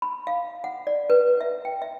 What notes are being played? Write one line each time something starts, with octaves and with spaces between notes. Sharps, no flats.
B5
F5
F#5
D5
B4
E5
G5
E5